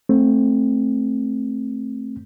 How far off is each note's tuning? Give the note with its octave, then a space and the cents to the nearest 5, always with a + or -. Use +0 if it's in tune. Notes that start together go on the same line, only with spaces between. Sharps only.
A3 +0 C4 +15